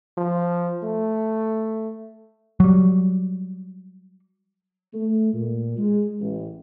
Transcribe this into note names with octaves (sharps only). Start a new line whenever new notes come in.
F3
A3
F#3 G3
A3
A#2
G#3
A1